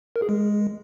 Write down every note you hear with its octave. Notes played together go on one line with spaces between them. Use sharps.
A#4
G#4
G#3